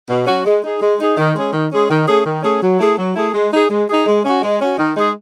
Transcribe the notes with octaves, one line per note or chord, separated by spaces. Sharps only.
B2
F#3 C#4 F#4
G#3
D#4 G#4
G#3
D#4 G#4
D#3
G#3 C#4 G#4
D#3
G#3 C#4 G#4
D#3
A3 C#4 G#4
D#3
A3 C#4 G#4
F#3
A3 E4 G#4
F#3
A3 E4 G#4
G#3
D#4 G#4
G#3
D#4 G#4
G#3
C#4 F#4
G#3
C#4 F#4
D#3
G#3 D#4 G#4